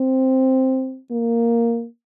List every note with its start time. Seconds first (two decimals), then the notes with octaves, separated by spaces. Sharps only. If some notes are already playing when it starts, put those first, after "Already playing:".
Already playing: C4
1.11 A#3